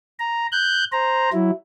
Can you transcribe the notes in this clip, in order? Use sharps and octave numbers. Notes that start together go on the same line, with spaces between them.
A#5
F#6 G6
C5 A#5
F#3 E4